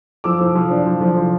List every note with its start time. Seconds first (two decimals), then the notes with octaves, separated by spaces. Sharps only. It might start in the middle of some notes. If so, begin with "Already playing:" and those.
0.24 F3 D6 E6
0.41 F3
0.55 F3
0.71 D4
0.86 F3
1.01 F3
1.17 F3